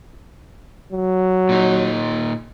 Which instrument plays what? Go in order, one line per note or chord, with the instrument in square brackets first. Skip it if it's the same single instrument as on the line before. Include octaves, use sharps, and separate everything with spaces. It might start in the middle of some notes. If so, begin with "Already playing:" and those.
[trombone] F#3
[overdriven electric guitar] A#2 D#4